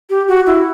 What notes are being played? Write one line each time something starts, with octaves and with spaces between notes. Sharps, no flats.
G4
F#4
E4